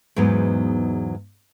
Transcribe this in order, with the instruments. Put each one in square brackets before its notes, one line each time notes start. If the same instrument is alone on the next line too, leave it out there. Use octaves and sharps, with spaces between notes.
[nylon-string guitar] E2 G#2 F#3 B3 D#4